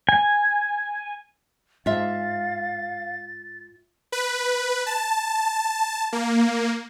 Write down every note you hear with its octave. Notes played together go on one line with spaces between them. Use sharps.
G#5
G#2 F4 E5 F5 A6
B4
A5
A#3